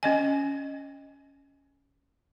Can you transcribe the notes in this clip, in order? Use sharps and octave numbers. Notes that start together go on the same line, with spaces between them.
C#4 D#5 G#5